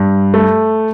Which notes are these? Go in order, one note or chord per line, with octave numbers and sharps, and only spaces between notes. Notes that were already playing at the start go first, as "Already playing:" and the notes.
Already playing: G2
A3